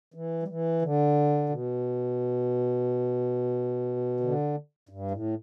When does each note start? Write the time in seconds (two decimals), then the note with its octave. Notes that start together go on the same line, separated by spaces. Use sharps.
0.14 E3
0.43 G3
0.48 E3
0.82 D3
1.49 B2
4.20 D3
4.89 G2
5.11 A2